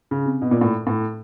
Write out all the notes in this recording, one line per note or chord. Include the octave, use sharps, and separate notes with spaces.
C#3
C3
B2
A#2
A2
A2